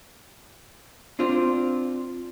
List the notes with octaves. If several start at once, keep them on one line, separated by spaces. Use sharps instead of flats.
C4 D4 F4 C5